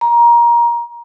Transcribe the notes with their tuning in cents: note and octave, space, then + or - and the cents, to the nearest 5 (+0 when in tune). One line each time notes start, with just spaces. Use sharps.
A#5 +20